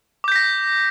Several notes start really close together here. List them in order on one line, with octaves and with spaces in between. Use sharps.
D6 G6 B6 A#6